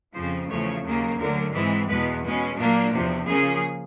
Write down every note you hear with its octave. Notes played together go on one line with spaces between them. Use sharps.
F2 C#3 F3 C5
E2 C#3 F3 A3 C#5
D#2 C#3 F#3 A#3
D2 D3 F#3 A#4
G#2 E3 G#3 C4
E2 B2 G#3 B3 B4
B2 G#3 C#4
A#2 F#3 A#3 D4
E2 C3 F3
C#3 F3 A#3 C#4 G#4